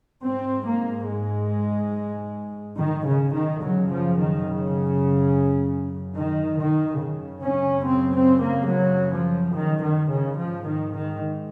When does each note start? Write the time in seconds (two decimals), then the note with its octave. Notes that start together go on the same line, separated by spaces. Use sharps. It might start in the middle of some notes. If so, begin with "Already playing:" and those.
0.24 G#2 C4
0.66 A#3
1.08 G#3
2.77 D#3
3.06 C#3
3.33 D#3
3.62 F#2 C#3 F#3
3.90 F3
4.18 D#3
4.47 C#3
6.15 D#3
6.59 D#3
7.01 F#2 C#3
7.42 C#4
7.85 C4
8.14 C4
8.42 A#3
8.69 F#3
9.12 F3
9.54 D#3
9.82 D#3
10.11 C#3
10.38 G#2 F3
10.67 D#3
10.94 D#3